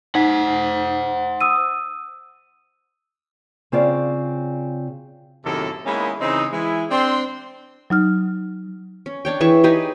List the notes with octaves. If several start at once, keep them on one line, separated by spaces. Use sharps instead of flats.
D#4 C5 F#5 B6
D#6 E6 D#7
C#3 C4 F4 D5
F#2 A2 C3 D#3 A#3 A4
G#3 A#3 B3 C#4 D#4 E4
C#3 E3 C4 D#4
E3 G#3 E4
C4 D4 C6
F#3 D#4 F6
C#4
D4 C#5 G5
E3 G#4 E5 C#6
D#4 G4 G#4 B4